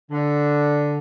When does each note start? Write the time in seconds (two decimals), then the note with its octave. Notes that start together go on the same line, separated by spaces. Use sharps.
0.11 D3